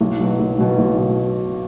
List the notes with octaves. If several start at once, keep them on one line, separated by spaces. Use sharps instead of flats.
B1
B2 F#3
B1
B2 F#3
B1
B2